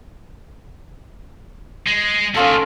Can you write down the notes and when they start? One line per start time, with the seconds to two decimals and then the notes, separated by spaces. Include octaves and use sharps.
1.88 G#3
2.35 D2 D#3 C#4 F4 A4